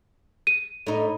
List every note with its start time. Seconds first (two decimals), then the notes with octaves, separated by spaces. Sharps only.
0.47 D#7
0.87 A2 D#4